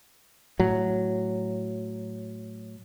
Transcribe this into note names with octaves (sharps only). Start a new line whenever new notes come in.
A2 F#3